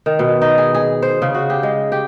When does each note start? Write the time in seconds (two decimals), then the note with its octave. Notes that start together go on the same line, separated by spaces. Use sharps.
0.06 D#3
0.19 B2
0.42 D#4
0.58 G#4
0.75 G#4
1.02 C5
1.22 C#3
1.34 F#4
1.50 G4
1.63 G#3
1.92 G4